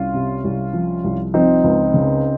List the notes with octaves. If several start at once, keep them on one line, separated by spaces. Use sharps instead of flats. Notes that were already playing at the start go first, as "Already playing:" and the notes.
Already playing: C2 C#4 F4
C3
C2
F3
C2
F3 C4 D#4
C#2
C#3